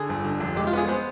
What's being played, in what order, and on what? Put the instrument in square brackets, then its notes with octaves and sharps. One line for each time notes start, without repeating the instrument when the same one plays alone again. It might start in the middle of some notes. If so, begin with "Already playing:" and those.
Already playing: [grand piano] D3 [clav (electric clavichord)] G#4
[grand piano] G1
D3
F1
[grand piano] G#3 [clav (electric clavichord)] G4
[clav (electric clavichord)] F4
[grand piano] B3 [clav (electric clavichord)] G#4
[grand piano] B3 [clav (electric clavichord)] C5